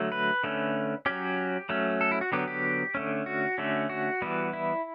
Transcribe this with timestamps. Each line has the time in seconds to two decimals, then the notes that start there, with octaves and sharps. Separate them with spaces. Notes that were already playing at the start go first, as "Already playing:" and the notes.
Already playing: D3 F#3 A3
0.12 B4
0.44 D3 A3 C#4
1.06 F#3 C#4 G4
1.69 F#3 A3 C#4
2.01 A4
2.11 E4
2.21 F#4
2.32 D3 F#3 B3 G4
2.48 G4
2.95 D3 A3 C#4
3.26 F#4
3.58 D3 A3 C#4
3.89 F#4
4.22 E3 G3 B3
4.53 E4